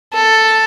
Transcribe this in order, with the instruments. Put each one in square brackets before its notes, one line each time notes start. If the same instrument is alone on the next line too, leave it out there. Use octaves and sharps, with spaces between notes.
[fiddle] A4